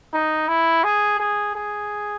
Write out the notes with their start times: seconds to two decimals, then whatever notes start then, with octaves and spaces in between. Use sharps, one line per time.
0.14 D#4
0.48 E4
0.84 G#4
1.20 G#4
1.56 G#4